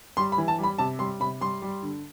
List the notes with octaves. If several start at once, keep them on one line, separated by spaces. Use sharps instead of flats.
G3 C6
B5
E3
A5
G3
B5
C3 A5
G3 C6
C3 B5
G3 C6
G3
D3